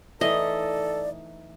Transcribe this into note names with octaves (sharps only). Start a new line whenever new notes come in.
E3 A3 D#4 A4 D5 D#5